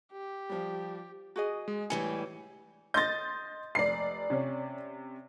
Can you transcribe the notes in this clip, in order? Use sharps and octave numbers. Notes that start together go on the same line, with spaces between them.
G4
F3 G3
F#4 G#4 D#5
G#3
A2 E3 G3 G#5 C#7
D#5 C6 G6 A6 A#6
F1 D5 C7
C3 C#4